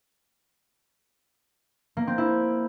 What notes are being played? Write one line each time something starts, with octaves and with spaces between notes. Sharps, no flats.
A#3
C4
E4